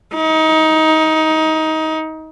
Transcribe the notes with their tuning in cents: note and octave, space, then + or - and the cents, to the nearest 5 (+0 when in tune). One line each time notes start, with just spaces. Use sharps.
D#4 +20